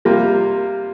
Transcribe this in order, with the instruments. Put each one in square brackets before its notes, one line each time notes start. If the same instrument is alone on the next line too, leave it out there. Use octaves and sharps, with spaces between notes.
[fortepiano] C3 G3 A#3 F4